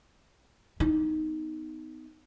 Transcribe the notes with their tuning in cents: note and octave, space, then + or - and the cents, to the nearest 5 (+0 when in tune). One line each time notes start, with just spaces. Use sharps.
B3 +30 D#4 +0